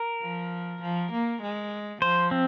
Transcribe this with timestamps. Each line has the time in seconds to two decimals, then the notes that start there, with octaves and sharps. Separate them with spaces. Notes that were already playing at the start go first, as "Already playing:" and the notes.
Already playing: A#4
0.22 F3
0.82 F3
1.12 A#3
1.42 G#3
2.02 F3 C5
2.31 C4